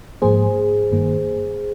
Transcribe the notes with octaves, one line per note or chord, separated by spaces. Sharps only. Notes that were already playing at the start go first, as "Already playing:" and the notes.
G#2 F3 A#3 G#4 C5
G2 D#3 A#3